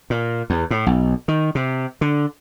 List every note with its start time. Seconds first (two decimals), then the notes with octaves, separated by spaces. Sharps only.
0.10 A#2
0.50 E2
0.71 A2
0.86 B1
1.28 D#3
1.55 C3
2.01 D3